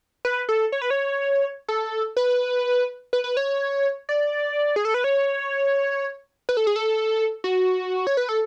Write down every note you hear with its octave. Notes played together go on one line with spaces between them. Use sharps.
B4
A4
C#5
B4
C#5
A4
B4
B4
B4
C#5
D5
G#4
A4
B4
C#5
B4
A4
G#4
A4
F#4
C#5
B4
A4